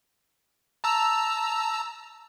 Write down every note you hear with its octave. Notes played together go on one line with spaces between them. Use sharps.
A5 A#5 E6